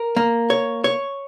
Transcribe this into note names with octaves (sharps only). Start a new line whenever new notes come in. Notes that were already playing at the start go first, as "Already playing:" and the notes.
Already playing: A#4
A#3
C#5
C#5